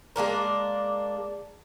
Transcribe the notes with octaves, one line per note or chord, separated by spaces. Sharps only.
G#3 A#3 D4 A#4